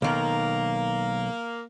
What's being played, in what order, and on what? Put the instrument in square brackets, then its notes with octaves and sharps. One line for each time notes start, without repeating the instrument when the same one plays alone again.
[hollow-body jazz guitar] B1 D#3 [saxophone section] A#3